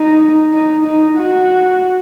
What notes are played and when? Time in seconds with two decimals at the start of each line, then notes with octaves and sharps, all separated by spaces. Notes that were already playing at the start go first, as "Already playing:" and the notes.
Already playing: D#4
0.53 D#4
0.85 D#4
1.18 F#4